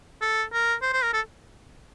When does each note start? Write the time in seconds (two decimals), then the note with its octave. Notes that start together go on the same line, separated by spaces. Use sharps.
0.22 A4
0.53 A#4
0.82 C5
0.93 C5
1.03 A#4
1.13 A4